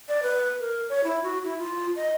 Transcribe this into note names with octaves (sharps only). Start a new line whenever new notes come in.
D5
B4
A#4
C#5
E4
F#4
E4
F4
D#5